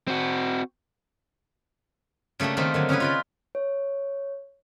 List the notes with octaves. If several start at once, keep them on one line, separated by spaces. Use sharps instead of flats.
C4 F#4
C#3 A3 A#3 D4 G4
D#3 A3 A#3 C4 G4
D3 D#3 F#3
C#3 C#4 D#4 G#4 B4
F4 B4 D5
C#5